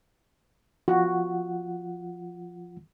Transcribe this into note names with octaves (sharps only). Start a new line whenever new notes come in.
F3 F4 F#4 F#5